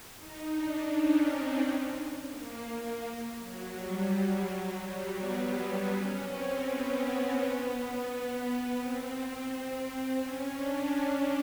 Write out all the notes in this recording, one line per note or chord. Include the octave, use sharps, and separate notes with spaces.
D#4
D4
C#4
C4
A#3
A#3
F#3
G3
G3
F#3
G3
B3
B3
C#4
C4
B3
B3
C4
C#4
D4
C#4